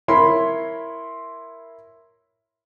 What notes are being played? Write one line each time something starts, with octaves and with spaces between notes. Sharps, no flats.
E4 A#4 C#5 B5 C6